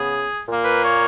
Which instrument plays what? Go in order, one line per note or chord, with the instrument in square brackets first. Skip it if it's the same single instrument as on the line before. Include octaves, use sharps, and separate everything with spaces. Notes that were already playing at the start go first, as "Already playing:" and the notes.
Already playing: [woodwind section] C#3 B3 G#4
A#2 A#3
B4
C#5